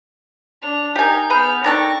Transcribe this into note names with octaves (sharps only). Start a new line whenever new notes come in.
D4 F7
D#4 G4 A#4 G#5 G6
B3 G#4 B4 F6
D#3 D4 A4 G5 C#6 A#6